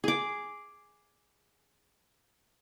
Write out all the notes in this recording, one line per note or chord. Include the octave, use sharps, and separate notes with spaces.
G#4 D6